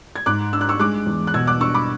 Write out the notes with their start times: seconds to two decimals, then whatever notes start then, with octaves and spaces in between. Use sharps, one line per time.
0.16 G#6
0.26 G#2 D6 F#6
0.53 D4 E6
0.61 F#6
0.69 C#6 E6
0.79 G#3 D6 F#6
1.07 E2
1.27 F#6
1.34 B2 E6 G#6
1.47 D6 F#6
1.60 D4 C#6 E6
1.74 B5 D6